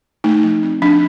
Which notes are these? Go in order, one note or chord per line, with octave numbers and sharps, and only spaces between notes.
A3 D#4
F3
C4
F3 D4